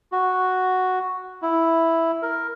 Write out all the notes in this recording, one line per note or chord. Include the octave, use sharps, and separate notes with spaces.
F#4
E4
A#4